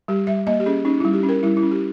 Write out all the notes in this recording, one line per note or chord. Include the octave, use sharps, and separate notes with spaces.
G3 G4
G3 E5
A#3 D#5
G4
C#4 G#4
C#4 D#4
G3 E4
G4
C#4
A#4
G3 E4
E4
C#4
G4